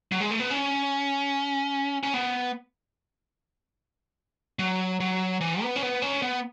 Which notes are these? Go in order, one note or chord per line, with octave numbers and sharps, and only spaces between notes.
F#3
G#3
A3
B3
C#4
C#4
B3
F#3
F#3
E3
B3
C#4
B3
C#4
B3